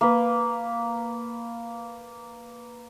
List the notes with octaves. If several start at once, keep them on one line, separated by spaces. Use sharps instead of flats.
A#3 B4